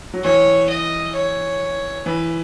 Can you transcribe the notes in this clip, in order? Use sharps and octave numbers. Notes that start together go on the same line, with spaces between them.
F#3
E3 C#5
D#5
C#5
E3 B4